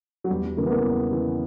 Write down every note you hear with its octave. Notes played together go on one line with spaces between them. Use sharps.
F#3
E2 G3
G3
C#3 E3 A#3
B3
A#3
E2
C#3 E3